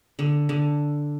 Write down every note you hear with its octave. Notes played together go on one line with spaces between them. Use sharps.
D3
D3